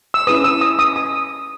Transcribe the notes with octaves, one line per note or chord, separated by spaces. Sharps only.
E6
C#4 E4 G#4 B4 D#6
E6
D#6
D#6
D#6